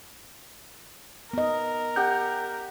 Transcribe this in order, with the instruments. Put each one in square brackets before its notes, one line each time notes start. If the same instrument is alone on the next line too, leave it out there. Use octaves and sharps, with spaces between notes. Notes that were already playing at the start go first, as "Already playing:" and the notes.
[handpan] B3 D#5 [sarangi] A#4
[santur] G4 F#5 G5 [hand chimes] G6